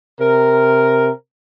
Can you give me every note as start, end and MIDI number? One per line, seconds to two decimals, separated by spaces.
0.20 1.09 48
0.20 1.09 70